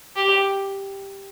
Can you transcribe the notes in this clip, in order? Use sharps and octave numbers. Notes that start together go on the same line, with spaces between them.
G4